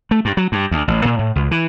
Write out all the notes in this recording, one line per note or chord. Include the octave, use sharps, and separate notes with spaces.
A3
G2
F#3
G2
D2
A1
A#2
A2
C#2
E3